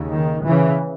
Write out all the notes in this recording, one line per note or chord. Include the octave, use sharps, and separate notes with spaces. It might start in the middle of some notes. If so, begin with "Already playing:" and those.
Already playing: D#2 C#3
D#3
C#3 E3